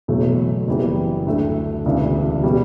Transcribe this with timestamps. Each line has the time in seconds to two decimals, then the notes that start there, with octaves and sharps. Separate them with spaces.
0.08 F#1 E2 B2 F#3 A3
0.67 F#1 F#2 E3 G3 B3
1.27 D2 D3 A3
1.85 E1 D2 C#3 E3
2.44 B2 G3